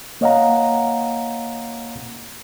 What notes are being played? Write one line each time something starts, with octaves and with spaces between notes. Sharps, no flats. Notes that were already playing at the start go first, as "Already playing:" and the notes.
A#3 C#5 D#5 F5 F#5 A#5